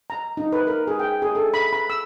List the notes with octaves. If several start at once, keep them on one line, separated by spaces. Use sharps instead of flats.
A#5
D#4
B4
A#4
G#4
G5
G#4
A4
B5
B5
E6